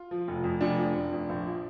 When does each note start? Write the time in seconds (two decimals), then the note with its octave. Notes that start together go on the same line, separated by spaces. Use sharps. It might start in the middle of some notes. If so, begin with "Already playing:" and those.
Already playing: F4
0.11 F3
0.28 F1
0.44 F2
0.61 F1 D4
0.78 F3
0.95 F1
1.12 F2
1.29 A#1
1.46 F3